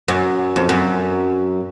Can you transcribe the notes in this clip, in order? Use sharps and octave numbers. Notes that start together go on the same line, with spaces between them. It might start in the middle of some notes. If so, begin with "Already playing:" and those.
F#2
F2
F#2